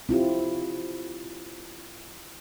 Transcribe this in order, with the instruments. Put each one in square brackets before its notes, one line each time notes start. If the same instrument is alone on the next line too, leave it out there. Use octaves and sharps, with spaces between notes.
[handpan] C4 E4 F4 G4